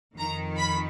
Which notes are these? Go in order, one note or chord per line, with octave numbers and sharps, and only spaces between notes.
F2 D#3 A#5
B5